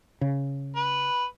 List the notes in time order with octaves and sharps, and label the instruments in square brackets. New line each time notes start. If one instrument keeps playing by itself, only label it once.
[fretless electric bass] C#3
[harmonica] B4